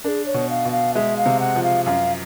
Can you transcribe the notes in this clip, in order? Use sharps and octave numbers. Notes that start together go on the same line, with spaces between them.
D4 G#4 A#4
C#5
B2
F5
B2
F5
G#3 E5
F5
C3
F#5
F3
F5
F#2 F5